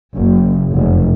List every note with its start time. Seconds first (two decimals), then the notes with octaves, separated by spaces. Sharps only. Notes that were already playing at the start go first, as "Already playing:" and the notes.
0.17 F#1
0.75 F1